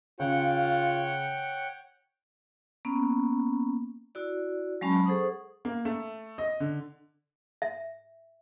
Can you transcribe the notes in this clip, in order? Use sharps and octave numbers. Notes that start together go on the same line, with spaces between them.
C#3 F4 C#5 F#5 G5
A#3 B3 C#4
E4 F#4 D5
F#3 G#3 C#4 A5 B5
G#4 A4 C5 F#5 C#6 D#6
A#3
A3
D#5
D3
E5